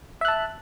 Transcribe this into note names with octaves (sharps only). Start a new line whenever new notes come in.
E5 A5 F#6